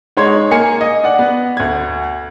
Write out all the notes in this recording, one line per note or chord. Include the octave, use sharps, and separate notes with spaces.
G#3 D#4 C#5 C6 G#6
A#3 G#5 C#7
D#5
D5 F#5
B3
D2 G#6